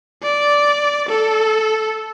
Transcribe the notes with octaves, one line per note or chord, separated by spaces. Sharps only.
D5
A4